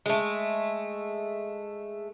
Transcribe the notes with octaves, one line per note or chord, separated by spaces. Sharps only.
G#3 A3